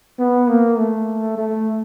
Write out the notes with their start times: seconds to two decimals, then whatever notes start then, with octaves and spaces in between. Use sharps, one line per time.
0.19 B3
0.49 A#3
0.78 A3
1.38 A3